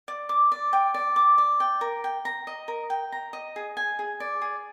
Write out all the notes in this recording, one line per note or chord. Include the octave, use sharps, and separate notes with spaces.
D5
D6
D5
G5
D5
D6
D5
G5
A#4
G5
A#5
D#5
A#4
G5
A#5
D#5
G#4
G#5
G#4
D5
G#4